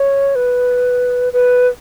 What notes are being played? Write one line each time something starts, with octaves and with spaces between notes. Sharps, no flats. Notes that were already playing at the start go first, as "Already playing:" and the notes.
Already playing: C#5
B4
B4